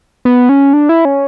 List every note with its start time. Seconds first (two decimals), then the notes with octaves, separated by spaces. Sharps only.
0.25 B3
0.49 C#4
0.73 D4
0.89 E4
1.05 C#4